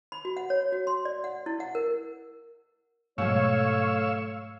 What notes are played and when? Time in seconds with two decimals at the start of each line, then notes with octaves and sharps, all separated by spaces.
0.12 B5
0.25 F#4
0.37 F#5
0.50 C#5
0.72 F#4
0.87 C6
1.05 D5
1.24 F#5
1.46 E4
1.60 F#5
1.75 A#4
3.18 G#2 B2 F#3 A3 C#5 F5 C#6 E6